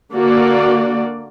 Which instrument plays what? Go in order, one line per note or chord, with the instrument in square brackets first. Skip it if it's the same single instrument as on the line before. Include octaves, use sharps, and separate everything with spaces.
[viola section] D3 A#3 F#4 D5